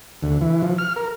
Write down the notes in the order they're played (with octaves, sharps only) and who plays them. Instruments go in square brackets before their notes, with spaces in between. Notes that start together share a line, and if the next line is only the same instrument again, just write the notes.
[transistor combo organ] D2
E3
F3
F6
A#4